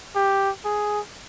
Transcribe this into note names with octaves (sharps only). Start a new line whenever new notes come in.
G4
G#4